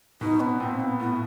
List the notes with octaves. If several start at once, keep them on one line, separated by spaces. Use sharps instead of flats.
B2 D#4
B3
A#2 C4
B3
A2 B3